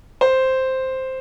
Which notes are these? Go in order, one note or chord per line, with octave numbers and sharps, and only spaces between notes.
C5